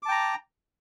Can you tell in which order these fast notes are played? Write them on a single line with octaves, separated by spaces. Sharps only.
D6 A5 G5 A#5